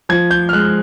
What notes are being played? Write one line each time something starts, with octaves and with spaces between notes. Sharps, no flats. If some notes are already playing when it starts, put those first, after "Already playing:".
F3 G#6
G6
F6
G#3 F#6